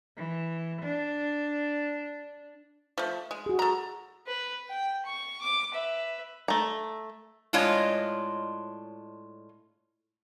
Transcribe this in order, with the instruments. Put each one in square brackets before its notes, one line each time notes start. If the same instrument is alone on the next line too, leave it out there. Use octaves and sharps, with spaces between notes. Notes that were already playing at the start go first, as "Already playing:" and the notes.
[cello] E3
D4
[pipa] F3 A3
G#3
[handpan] F#4 G#4
[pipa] A4 A#5
[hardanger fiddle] B4
G5
C#6
D6
B4 E5
[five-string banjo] A3 A#5
[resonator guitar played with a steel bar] A2 G#3 D4 F4 C#5 D#5